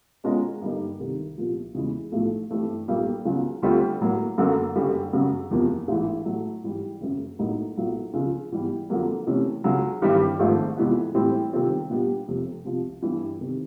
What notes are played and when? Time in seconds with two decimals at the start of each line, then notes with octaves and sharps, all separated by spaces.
0.24 B2 G#3 C#4 F4 A#4
0.62 G2 D3 G3 A#3 D#4
1.00 C2 C3 D#3
1.38 C2 A#2 F3
1.75 E2 C#3 E3 G#3
2.12 B1 A2 F3 A3
2.50 G2 E3 A3 C4
2.88 B1 A#2 G3 A#3
3.25 C#2 C#3 F#3 B3
3.62 D2 D3 G3 C4 F4
4.01 A2 F#3 A#3
4.38 F#2 D3 F#3 A#3
4.75 F#1 F#2 D3 G3
5.13 F#2 C#3 F#3
5.50 F#1 E2 C3 F3 A#3
5.88 A1 G#2 E3
6.25 A2 F#3 A3
6.64 G#2 E3 G3
7.01 F#1 F#2 C#3
7.39 B1 A2 F#3 A#3 D#4
7.77 B1 A#2 F#3 B3 E4
8.14 C#2 C#3 F3
8.52 G#2 E3 G3 B3
8.90 F2 D3 F#3 A#3
9.27 C3 E3 A3 C#4
9.64 C#2 C#3 F#3
10.02 G#1 G2 E3 G3
10.39 G#1 G#2 F3 A3
10.78 F2 C3 E3 G#3 B3
11.15 A2 E3 G3 C4
11.53 C3 D#3 G3 C4 F4
11.90 A#2 G3 B3 D4 G4
12.27 F1 F2 C3
12.65 C2 C3 F3
13.03 G2 E3 G3 B3 D4
13.41 C3 D#3